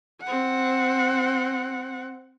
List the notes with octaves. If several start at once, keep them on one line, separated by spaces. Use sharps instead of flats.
C4 F#5